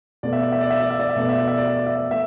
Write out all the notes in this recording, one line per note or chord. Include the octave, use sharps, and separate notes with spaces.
B2 A3 D5
E5
D5
E5
D5
E5
D5
E5
D5
E5
B2 A3 D5
E5
D5
E5
D5
E5
D5
E5
D5
A3 E5